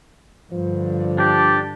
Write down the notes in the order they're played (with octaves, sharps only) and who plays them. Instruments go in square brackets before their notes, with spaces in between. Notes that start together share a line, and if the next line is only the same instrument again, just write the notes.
[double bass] G2 D3 [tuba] F3
[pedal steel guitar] D4 D5 [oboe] G4